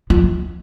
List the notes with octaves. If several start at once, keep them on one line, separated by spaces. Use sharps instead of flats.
F3